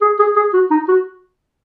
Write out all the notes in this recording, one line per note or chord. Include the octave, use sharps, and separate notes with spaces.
G#4
G#4
G#4
F#4
D#4
F#4